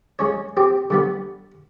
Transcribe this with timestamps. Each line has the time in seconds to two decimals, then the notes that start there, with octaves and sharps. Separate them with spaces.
0.19 G#3 C#4 C#5
0.57 C4 G4
0.90 D3 G3 B3